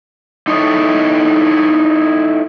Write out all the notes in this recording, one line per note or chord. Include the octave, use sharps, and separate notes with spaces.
D#4 E4 A4 C#5 D#5